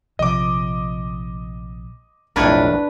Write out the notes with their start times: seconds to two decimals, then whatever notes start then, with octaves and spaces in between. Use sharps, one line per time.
0.19 A#1 C3 F3 D#5 D6
2.36 B1 F2 A2 D4 A#4 B4 C#5